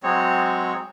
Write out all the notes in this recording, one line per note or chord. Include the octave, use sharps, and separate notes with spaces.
F#3 G#3 C4 C#5